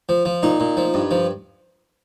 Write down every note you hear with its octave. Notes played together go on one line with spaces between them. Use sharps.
F3
F3
A#2 D#4
A#2
F3
G2
F3